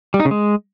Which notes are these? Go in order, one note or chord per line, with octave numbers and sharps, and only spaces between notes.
G3
D#4
C#3
G#3